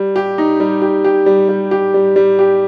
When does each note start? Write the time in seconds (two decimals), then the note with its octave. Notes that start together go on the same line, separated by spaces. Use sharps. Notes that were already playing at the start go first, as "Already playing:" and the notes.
Already playing: G3
0.16 G4
0.38 D#4
0.60 G3
0.82 G4
1.04 G4
1.26 G3
1.49 G3
1.71 G4
1.94 G3
2.16 G3
2.39 G4